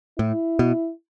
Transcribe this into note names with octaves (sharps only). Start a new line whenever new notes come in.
A2 E4
B2